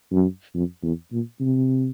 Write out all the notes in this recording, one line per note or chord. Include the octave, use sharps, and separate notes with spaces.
F#2
F2
E2
A#2
C3